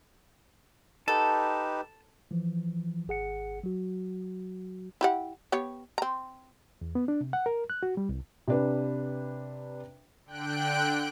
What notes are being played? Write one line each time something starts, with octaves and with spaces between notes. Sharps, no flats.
D#4 G4 A4 B4 A5
E3 F3
G#1 G#4 F#5 C#7
F#3 F#4
E4 G4 F#5
B3 G4 C#5
C4 A#5
E2
B3
D4
C3
F#5
A#4
F#6
F#4
G3
C2
C3 D4 B4
D3 G5 F#6 D7